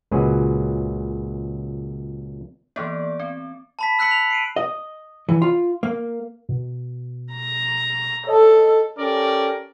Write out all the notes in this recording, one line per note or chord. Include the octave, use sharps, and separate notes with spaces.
C#2 A#2 F#3 G#4 B4
E3 A#3 B3 D5
C4
A5 B5 B6
E6 F#6 B6 C#7 F#7
F7
C7 D7 D#7
D#5
E3
F4
A#3
B2
A#5
A4 C#5 D#5 A5
C#4 G4 A4 A#4 D5